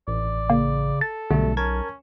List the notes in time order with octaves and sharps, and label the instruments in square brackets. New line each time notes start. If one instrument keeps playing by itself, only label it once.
[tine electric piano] A1 [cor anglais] D5
[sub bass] C#3 [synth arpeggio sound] A#3
[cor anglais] A4 [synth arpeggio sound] A6
[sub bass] B1 [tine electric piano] B2 G3 A3 [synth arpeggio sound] D3
[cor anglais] C#4 [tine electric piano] A#4 A5 G#6